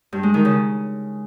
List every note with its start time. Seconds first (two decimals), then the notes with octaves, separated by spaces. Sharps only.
0.13 G2
0.23 G#3
0.34 D#3
0.45 C#3